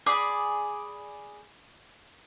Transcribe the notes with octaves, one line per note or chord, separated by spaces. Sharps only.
G#4 D5 B5